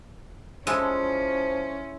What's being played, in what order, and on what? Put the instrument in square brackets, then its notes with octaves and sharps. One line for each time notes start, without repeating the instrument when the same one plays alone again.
[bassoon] F3 [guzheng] G#3 A4 [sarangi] C#4 [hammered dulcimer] E4 F4